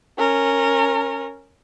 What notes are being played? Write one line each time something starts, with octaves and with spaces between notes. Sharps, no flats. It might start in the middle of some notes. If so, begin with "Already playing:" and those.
C#4 A#4